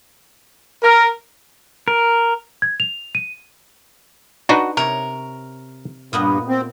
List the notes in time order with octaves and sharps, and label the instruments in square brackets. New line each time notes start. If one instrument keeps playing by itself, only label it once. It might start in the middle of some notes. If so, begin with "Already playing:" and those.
[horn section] A#4
[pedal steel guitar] A#4
[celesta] G#6
F7
D#7
[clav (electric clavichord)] D4 D#4 B4 [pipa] F#4
[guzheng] C3 C#5 [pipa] A#4
[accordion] G2 [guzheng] A#2 B3 D#5
[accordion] C4